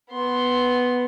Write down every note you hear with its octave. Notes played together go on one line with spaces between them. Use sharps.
B3 C6